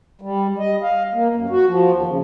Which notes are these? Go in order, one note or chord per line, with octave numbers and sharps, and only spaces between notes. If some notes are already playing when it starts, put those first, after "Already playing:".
G3
D#5
F5
A#3
F#2
F#4
F3
D#2
C#3